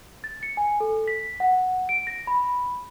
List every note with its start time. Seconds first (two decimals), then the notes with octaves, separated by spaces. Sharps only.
0.24 A6
0.43 C#7
0.57 G#5
0.80 A4
1.08 B6
1.40 F#5
1.89 D7
2.07 A#6
2.27 B5